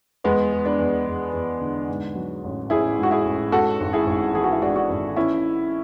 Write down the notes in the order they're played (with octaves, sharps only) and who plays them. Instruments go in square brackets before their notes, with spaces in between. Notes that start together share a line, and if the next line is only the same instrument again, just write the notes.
[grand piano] E2 G#3 B3
E2
B3 D4
E2
E2
E2
D3
G#2
F#3
A1
A1 E4 G#4
G#2 F#4
E4 G#4
A1
G#2 F#4 A4
G#1
E4 G#4
G#1
E3 G#4
F#4
E4
G#2 D4 F#4
D4 F#4
G#1
E3 C#4 E4